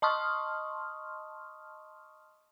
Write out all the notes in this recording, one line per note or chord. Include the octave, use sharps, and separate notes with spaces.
D#5 A5 C6 C#6 D#6 F6